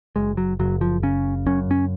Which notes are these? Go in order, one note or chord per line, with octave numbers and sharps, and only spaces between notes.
F#1 G#3
F#3
F#1 F#3
F3
C#3 C#4
F#2 C#4
C#4